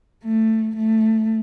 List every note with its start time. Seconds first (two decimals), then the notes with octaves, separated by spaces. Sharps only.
0.24 A3
0.76 A3